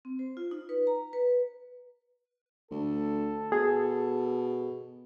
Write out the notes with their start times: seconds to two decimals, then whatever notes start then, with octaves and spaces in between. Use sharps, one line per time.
0.05 C4
0.19 C5
0.37 F4
0.51 D#4
0.69 B4
0.87 A#5
1.13 B4
2.71 D2 A4
3.52 B2 G#4